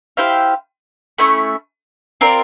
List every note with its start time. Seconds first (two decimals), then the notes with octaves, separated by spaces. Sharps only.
0.17 E4 G4 C5 F5
1.18 A3 C#4 E4
2.21 C4 F4 A#4 D5